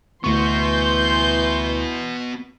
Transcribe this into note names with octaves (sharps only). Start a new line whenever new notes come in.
D2 E3 B3 F#4 C6 C#6 G6